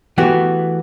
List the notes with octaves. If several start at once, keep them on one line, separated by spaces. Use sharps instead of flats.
E3 A3 B3 F#4 G4